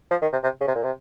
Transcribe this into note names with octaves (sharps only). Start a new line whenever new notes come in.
F3
D#3
C3
C3
C#3
C3
A#2
C3